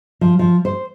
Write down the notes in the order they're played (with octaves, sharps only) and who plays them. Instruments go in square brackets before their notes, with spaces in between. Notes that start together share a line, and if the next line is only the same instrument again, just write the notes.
[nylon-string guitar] F3
F3
C5